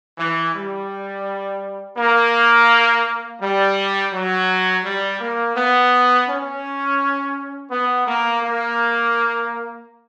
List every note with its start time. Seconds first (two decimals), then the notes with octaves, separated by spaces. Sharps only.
0.18 E3
0.55 G3
1.97 A#3
3.41 G3
4.12 F#3
4.84 G3
5.20 A#3
5.56 B3
6.27 C#4
7.71 B3
8.06 A#3
8.42 A#3